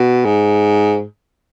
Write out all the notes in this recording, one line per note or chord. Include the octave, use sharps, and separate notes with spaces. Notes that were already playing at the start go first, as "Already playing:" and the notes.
Already playing: B2
G#2